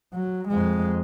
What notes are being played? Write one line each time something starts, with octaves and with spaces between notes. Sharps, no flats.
F#3
F2 G#3